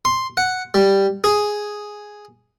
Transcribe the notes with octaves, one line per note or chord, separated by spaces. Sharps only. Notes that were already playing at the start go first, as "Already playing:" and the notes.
C6
F#5
G3
G#4